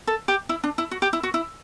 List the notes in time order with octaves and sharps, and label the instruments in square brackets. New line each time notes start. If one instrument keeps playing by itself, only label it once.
[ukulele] A4
G4
E4
D4
E4
F#4
G4
E4
F#4
E4